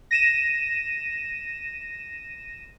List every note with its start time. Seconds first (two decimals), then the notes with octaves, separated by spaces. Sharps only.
0.11 A#6 D#7 E7